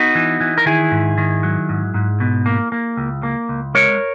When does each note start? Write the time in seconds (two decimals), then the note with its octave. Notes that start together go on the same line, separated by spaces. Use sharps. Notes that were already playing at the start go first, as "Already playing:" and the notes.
Already playing: B3 D#4 F#4
0.15 E3
0.40 E3
0.58 A#4
0.66 D#3 E4 G#4
0.91 G#2
1.18 D#3
1.43 F#3
1.69 G#2
1.94 G#2
2.20 B2
2.46 A#3
2.72 A#3
2.97 C#2
3.23 A#3
3.49 C#2
3.74 G#3 A#4 C#5